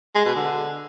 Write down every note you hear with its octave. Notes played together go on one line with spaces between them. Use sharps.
G#3
B2
D3